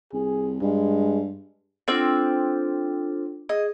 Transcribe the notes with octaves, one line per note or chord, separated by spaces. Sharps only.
C2 G#4
G2 G#3
C4 D4 F4 A4 C5 G5
G#4 D#5